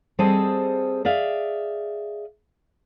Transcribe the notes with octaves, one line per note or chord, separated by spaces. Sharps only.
G3 C4 G#4 A4 C5 D#5
G#4 D5 E5 F5